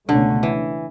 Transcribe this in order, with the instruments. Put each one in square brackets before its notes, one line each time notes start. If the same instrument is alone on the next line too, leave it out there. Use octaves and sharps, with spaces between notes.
[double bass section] C#2 B2 A3 C#4 [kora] D3
[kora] E3